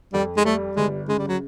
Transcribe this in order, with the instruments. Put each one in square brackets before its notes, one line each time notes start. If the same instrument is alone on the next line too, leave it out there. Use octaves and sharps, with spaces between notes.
[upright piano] F2 [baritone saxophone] G3
[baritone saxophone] G#3
[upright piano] G3 [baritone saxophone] A3
[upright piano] G1 [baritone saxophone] G#3
[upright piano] C#3 [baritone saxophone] G#3
[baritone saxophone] G3
F#3